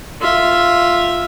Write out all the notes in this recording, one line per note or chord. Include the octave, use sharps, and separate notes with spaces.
F4 E5